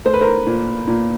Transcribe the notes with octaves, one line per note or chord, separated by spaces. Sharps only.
A3 C5
B4
A#4 C5
A#2
A#2